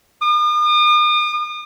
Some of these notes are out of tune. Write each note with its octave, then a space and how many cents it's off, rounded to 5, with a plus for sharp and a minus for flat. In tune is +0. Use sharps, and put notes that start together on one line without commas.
D#6 -45